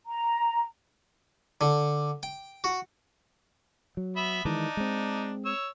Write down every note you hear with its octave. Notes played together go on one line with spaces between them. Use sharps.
A#5
D3
G5
F#4
F#3
B3 E5 B5
D#3 E3 G#3 D4 D#4
G#3 C4
C#5 E6